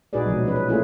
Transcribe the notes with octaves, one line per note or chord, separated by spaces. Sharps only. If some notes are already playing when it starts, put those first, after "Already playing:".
A#2 D#4 F#4 G#4 B4 D5
B2 F3 F#3 G#3
F3 F#3 C#4 B4
B4
A3 A#3 C#4 E4 F4 G#4